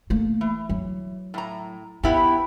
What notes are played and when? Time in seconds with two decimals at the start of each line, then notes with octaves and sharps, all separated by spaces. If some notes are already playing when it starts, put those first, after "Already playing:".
0.10 A3 A#3
0.41 E3
0.69 F#3
1.34 A2 A#5
2.03 B3 C4 E4 G4